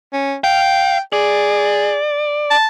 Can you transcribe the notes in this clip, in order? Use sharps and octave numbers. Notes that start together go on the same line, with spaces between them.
C#4
F5 G5
G#4 D5
A5